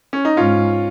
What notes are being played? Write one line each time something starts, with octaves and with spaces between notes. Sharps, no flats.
C#4
D#4
G#2 C#4 F4